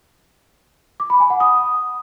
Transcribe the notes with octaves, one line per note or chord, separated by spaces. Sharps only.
D6
B5
G#5
F#5
D#6